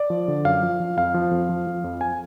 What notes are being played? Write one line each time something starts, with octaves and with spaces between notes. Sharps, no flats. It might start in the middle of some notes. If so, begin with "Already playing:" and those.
Already playing: D5
F3
D3
F#2 F5
F3
F3
F2 F5
F3
F2
F3
F3
F2
G#5